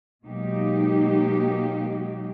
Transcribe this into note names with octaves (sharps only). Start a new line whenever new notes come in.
B2 F#3 G#3 A#3 D#4 G4